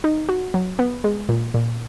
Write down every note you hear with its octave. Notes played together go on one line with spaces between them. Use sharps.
D#4
F#4
F#3
B3
G#3
A#2
A#2